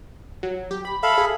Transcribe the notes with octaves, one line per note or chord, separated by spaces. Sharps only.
F#3
G4
B5
A4 E5 F5 B5
G#4